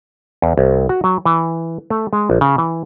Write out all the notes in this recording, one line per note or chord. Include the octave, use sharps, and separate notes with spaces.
E2
C2
F#4
F#3
E3
A3
G#3
A#1
C#3
E3